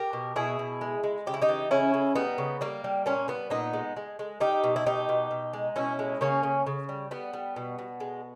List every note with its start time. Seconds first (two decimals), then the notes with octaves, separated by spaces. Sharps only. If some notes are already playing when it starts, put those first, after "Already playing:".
Already playing: G4 A#4
0.13 B2
0.36 B2 E4 G#4
0.59 B2
0.81 G#3
1.04 G#3
1.27 C#3 G4
1.34 E4
1.42 D#4 G4
1.49 E3
1.71 C#3 C#4 E4
1.94 C#3
2.16 G3 B3 D#4
2.38 C#3
2.61 G3 A#3
2.84 G3
3.06 A#2 A#3 C#4
3.28 G3 B3
3.50 A#2 B3 D#4
3.73 G#3
3.96 G#3
4.19 G#3
4.40 G3 D#4 G4
4.64 B2
4.76 E4
4.86 B2 D#4 G4
5.09 B2
5.31 B2
5.53 G#3
5.76 B2 C#4 E4
5.99 G#3
6.21 C#3 A#3 C#4
6.43 C#3
6.67 C#3
6.89 G3
7.11 G3 B3
7.33 G3
7.56 B2
7.79 B2
8.00 G#3